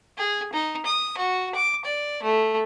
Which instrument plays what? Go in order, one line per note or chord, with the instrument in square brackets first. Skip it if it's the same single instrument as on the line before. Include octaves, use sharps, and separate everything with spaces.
[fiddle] G#4
D#4
D#6
F#4
D6
D5
A3